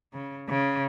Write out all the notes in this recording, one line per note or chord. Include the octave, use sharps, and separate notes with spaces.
C#3
C#3